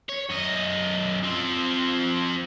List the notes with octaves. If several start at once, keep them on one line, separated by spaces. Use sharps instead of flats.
C#5
F#2 D#5
F3 C4